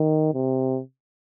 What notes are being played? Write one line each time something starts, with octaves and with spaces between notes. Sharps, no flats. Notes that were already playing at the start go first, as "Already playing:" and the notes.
Already playing: D#3
C3